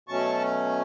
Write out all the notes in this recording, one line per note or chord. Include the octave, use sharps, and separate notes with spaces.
B2 F#3 A3 C#4 A5 C#6